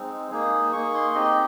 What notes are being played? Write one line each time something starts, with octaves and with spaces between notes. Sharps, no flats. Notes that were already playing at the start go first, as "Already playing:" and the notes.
Already playing: G#3 C4 D#4
A#3 D#4 G#4
A#3 D#4 G#4 C#6
C6
C4 D#4 G4 D#5